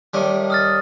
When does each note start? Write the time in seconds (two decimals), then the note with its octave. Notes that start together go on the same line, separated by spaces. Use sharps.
0.14 A2 D#3 G3
0.50 D#6 F6 A6